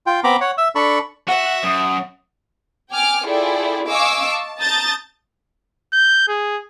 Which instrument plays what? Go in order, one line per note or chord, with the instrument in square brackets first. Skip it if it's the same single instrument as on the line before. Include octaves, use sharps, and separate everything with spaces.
[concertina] F4 G5
B3 C4 A#5 B5 D6
C#5 F#5
E5 E6
D4 A4 A5 B5 C#6
[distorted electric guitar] F#4 [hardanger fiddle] E5 [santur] F#5
[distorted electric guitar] F#2 [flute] D#6
[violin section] G5 G#5 D6 F6
E4 F4 G#4 A4 D5 G5
D#5 F5 G#5 C#6 D6 E6
A5
A5 A#5 D#6 G6 A6
[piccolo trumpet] G6
G#4